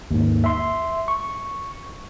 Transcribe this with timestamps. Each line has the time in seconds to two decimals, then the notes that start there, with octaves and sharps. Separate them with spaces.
0.11 D#2 G#2
0.44 E5 C6
1.08 C#6